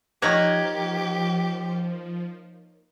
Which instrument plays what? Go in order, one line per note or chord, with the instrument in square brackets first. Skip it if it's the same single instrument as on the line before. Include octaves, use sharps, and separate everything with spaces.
[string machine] F3 [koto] A#3 D#4 F#5 [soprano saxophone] G4 [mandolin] C#5